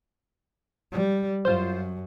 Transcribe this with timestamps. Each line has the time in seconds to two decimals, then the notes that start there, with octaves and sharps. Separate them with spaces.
0.92 G3
1.45 F#2 F4 C5